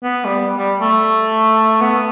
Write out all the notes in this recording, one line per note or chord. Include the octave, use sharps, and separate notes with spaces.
B3
G3
G3
A3
B3